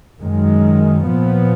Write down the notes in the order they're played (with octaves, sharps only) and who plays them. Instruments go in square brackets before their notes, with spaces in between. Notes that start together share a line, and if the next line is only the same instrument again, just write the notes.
[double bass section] F#2 D#3 G#3
A#2 F3 B3